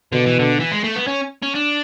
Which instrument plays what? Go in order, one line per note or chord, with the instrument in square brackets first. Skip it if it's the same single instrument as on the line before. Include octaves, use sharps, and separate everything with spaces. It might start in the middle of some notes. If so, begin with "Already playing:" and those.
[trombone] B2 [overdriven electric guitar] D3
[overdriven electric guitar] E3
D3
E3
G#3
A3
B3
C#4
C#4
D4